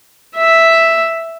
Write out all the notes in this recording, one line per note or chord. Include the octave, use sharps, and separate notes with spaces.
E5